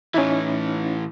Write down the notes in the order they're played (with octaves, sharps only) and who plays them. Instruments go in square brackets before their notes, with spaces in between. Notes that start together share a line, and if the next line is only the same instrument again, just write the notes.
[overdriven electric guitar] A2 E3 [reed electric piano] C#4 D#4 E4